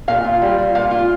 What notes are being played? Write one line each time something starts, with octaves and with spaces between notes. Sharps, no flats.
A#2 F5
F4
G3
F4
A#2 F5
F4